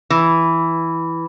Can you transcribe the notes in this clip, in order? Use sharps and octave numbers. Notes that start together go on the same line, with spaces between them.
E3